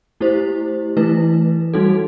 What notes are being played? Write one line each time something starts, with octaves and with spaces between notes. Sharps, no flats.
A3 E4 G4 C5
E3 A3 E4 B4
G3 D#4 F#4 A4